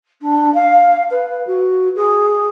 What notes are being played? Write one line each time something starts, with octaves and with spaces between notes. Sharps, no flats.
D4
F5
B4
F#4
G#4